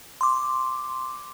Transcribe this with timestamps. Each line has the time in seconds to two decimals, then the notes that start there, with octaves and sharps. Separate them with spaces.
0.21 C6 D6